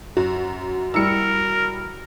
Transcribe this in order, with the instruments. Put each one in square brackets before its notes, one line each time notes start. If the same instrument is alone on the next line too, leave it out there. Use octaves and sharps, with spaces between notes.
[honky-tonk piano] F#2 [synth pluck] F#4
[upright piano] G3 E4 [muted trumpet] A#4 [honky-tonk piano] E6 C#7